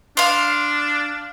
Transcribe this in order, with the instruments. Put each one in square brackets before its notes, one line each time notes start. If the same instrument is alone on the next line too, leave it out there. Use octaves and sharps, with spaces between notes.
[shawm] D4 [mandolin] F5 C6